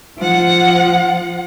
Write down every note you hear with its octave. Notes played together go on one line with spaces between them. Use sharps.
F3 F#5